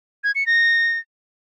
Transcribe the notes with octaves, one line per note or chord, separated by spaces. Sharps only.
G#6
C#7
A#6